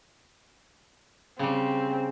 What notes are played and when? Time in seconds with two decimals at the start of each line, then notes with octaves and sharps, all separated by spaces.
1.39 C#3 G3 C4